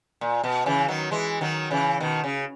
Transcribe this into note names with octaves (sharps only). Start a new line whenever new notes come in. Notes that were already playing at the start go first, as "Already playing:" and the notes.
A#2
B2
C#3 E3
D#3 F#3
E3 G#3
D#3 F#3
C#3 E3
B2 D#3
C#3